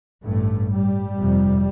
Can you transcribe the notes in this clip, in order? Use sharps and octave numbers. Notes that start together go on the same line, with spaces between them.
A1 G2 A3
G3
F1 F2 C3